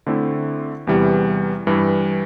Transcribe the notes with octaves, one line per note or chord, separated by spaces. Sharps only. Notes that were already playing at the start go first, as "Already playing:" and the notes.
D3 A3 C4 E4
E2 C3 E3 G3
G2 E3 G3